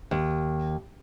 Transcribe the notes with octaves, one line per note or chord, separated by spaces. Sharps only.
D#2